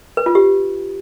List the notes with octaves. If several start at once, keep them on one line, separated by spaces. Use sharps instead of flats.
B4
F4
G4